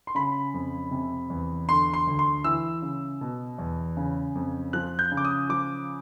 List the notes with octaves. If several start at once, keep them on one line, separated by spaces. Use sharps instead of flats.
C6
C#3 B5
F2
C3
E2
D3 C6
C6
D2
C6
E3 E6
C#3
B2
E2
C#3
F2
F3 F#6
G6
C#3
D6
D#6
F3 D6